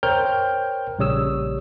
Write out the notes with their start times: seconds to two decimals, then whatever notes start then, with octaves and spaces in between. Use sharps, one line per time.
0.03 A#4 C5 C#5 G5 F6 G6
0.99 A#1 C#3 G3 C#5 D#6 E6